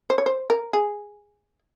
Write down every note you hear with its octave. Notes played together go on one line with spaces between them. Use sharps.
C5
C#5
C5
A#4
G#4